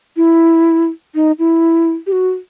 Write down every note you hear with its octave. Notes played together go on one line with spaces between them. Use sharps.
E4
D#4
E4
G4
F#4